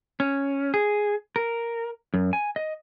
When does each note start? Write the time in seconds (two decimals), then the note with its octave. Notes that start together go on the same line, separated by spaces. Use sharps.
0.20 C#4
0.74 G#4
1.36 A#4
2.14 F#2
2.33 G#5
2.56 D#5